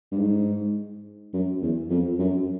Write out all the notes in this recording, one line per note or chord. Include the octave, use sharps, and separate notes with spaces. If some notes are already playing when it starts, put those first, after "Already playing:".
G2
G#2
F#2
E2
F2
F#2